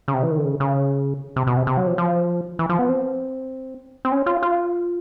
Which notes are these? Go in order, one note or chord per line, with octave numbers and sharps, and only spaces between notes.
C#3
C3
E3
D#3
D3
C#3
C#3
C3
B2
C3
C3
F#3
F3
F3
E3
F3
B3
C4
C4
C#4
F4
F4